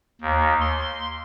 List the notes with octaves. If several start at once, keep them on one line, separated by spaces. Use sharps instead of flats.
D#2
C6